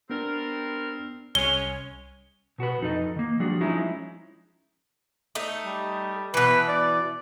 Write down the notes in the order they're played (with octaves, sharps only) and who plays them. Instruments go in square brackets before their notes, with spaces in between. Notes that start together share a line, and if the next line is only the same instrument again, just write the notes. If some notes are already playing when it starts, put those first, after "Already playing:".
[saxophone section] G3 C4 A#4 [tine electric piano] B3 D4
[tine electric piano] C2 [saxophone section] G#3 C#4 [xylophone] G7
[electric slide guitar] B2 F#4 A#4 B4
F2 D#4 A4 B4 D#5
D#3 A#3
F3 G3 D4 F#4 G#4
F3 G#3 C#4 D#4 E4
[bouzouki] A3 D#4
[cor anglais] G3
[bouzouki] B2 E3 [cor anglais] B4
[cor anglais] D5